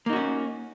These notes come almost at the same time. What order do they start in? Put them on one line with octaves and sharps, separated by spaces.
A#3 D#4 F#4 C#4